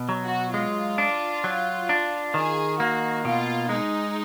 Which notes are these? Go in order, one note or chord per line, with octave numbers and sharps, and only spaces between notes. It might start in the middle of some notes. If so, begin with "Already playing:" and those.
Already playing: B2
F#3
F#4
G#3 F4
D4
F#3
D4
D#3 G#4
A#3 F#4
B2 F4
G#3 D#4